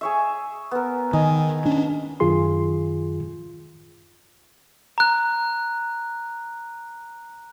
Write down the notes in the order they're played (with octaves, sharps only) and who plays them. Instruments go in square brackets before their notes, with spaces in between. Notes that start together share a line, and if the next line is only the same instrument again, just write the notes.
[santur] G#4 C#5 E5
B3 A#4
[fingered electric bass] D#3 [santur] D#5 G#5
[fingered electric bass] C#4 D4
[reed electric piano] F#2 D#3 F4 G#4 C6
[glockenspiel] A#5 F#6